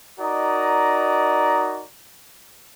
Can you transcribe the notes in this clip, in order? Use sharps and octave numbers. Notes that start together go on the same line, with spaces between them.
D#4 F#4 A#4 D5 D#5 A#5